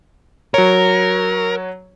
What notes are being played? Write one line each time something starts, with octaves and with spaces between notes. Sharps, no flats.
F#3 A#4 C#5